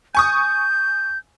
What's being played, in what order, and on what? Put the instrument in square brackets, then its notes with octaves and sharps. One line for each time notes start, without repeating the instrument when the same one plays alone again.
[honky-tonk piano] G#5 C#6 D#6 [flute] G6